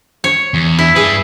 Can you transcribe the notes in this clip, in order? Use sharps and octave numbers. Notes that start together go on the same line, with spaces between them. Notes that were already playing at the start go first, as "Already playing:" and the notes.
C#5
E2
E4
G2 G#4 B4